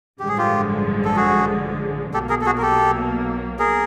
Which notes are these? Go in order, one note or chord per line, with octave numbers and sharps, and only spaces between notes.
A1 G2 D3 F3 G#3 G4
G#4
F4 G4
A4
F#4 G#4
B1 B2 F#3 A#3 G4 A4
G#4 A#4
A4
F#4 G#4
A#4
G4 A4
G#4 A#4